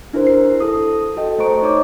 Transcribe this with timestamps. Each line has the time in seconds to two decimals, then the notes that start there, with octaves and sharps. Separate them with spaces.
0.13 D4 E4 G4 A#4 C5
0.27 C7
0.60 A4 D#6
1.16 F#4 A4 D#5 G5
1.38 A3 C5 D#5 A#5 C#6 D7
1.62 D#4 C#5 D6